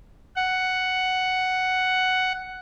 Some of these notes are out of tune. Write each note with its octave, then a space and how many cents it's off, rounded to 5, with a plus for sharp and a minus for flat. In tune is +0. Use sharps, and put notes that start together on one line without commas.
F#5 +5